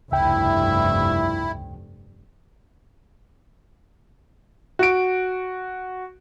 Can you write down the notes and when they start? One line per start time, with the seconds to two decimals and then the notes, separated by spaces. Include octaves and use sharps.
0.12 F1 C#2 G2 E4 E5 G5
4.79 F#4 D7